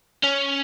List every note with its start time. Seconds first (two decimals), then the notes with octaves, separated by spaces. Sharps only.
0.24 C#4